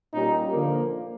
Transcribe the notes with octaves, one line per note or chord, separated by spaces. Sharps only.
A#2 G3 A#3 C#4 D#4
D3 F3 A#3